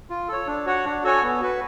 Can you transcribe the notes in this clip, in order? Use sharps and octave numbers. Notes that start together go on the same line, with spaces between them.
F4
A4 C#5
D4
F#4 C#5 F#5
D4
F#4 A4 C#5 G#5
B3
F#4 B4